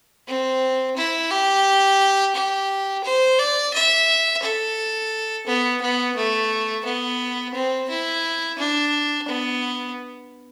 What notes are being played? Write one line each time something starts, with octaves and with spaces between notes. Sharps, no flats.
C4
E4
G4
G4
C5
D5
E5
A4
B3
B3
A3
B3
C4
E4
D4
B3